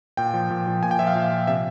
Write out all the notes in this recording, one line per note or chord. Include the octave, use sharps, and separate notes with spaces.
A#2 G5
F3
A#2
F3
A#2 G#5
G5
F3 E5
F5
A#2
F3
C3 E5